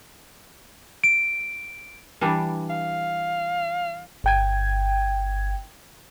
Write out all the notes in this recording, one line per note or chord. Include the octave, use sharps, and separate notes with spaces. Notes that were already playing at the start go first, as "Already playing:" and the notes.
D7
E3 G3 D4
F5
G1 G5 G#6